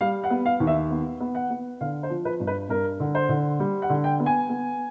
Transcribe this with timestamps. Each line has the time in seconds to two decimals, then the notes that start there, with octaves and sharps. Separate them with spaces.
0.01 G3 F5
0.24 F#5
0.30 B3
0.46 F5
0.60 D#2
0.67 E5
0.90 B3
1.20 B3
1.35 F#5
1.50 B3
1.81 D3 F5
2.03 C5
2.10 F3
2.25 B4
2.40 G2
2.47 B4
2.69 G2 A#4
3.00 D3
3.15 C5
3.29 D3
3.60 G3
3.82 F#5
3.90 D3
4.04 G5
4.20 B3
4.26 G#5
4.49 B3